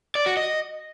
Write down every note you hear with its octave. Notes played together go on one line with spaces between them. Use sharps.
D5
F#4
D#5